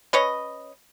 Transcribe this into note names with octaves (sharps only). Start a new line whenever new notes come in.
C#4 B4 C#5 D#5